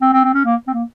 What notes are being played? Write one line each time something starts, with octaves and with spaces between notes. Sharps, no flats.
C4
C4
C4
C#4
A#3
C4
A#3